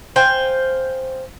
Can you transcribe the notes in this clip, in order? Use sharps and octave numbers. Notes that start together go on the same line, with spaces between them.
C5 F5 G5 G#5